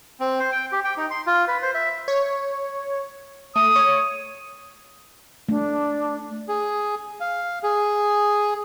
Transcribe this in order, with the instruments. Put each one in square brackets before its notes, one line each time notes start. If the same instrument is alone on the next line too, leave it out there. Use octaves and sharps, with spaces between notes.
[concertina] C4
C5
G5
G4
G5
D#4
C6
F4
B4
C5
E5
[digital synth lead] C#5
[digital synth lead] A3 [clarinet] D#6
[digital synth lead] C#5
[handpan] A3 [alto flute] D4
[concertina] G#4
F5
G#4